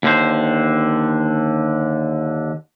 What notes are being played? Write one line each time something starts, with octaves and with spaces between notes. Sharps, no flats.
D#2 D3 C5